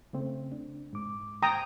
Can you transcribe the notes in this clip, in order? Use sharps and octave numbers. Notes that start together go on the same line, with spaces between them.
C#3 A3 C4
D4
G#2 D6
G5 A#5 D#6